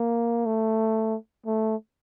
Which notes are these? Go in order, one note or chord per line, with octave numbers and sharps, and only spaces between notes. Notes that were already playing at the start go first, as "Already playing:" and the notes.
Already playing: A#3
A3
A3